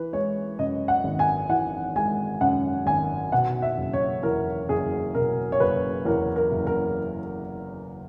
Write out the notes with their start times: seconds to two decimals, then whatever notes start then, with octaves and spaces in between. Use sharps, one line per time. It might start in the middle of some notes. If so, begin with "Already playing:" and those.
Already playing: E3 B4
0.13 G#3 C#5
0.59 F#2 D#5
0.88 F#5
1.04 G#1
1.19 G#5
1.49 E3 F#5
1.96 G#3 G#5
2.41 F#2 F#5
2.86 G#1 G#5
3.32 B2 F#5
3.62 E5
3.78 F#1
3.94 C#5
4.23 E2 A#4
4.69 F#1 G#4
5.14 B2 A#4
5.52 C#5
5.60 F#1 B4
6.05 E2 A#4
6.36 A#4
6.51 F#1
6.67 A#4